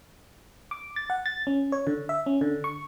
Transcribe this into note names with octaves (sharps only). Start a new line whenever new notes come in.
D6
A6
F#5
A6
C#4
C#5
D3
E5
C#4
D3
C#6